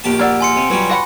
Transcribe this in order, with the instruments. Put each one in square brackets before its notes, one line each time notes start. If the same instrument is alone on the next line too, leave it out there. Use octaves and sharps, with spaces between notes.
[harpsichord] A#1 G4 A5
[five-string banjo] A#3 D5 [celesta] F#5 E6 F6
[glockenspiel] G#5 C6 C#7
[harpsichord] C3
[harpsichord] F#3 G3 [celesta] F4 B4
[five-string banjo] F#4 F#5 B5